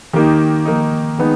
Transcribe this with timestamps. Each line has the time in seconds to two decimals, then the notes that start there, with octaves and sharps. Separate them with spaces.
0.13 D#3 A#3 D#4 G4
0.65 D#3 A#3 D#4
1.18 D#3 G#3 B3 D#4